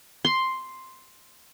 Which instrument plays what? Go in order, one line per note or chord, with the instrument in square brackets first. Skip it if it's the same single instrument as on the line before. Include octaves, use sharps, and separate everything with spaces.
[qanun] C6